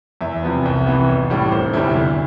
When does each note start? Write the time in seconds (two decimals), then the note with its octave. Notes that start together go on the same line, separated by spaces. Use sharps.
0.21 E2 E5
0.43 C3 F3 B3
0.65 C2
0.87 C3 E3 B3 E4
1.09 A1
1.30 A2 G3 D4
1.52 F1 C5
1.73 E2 D3 G3 E4
1.96 D2